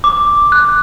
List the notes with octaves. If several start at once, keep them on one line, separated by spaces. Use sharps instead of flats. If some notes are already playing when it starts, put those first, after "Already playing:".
D6
F#6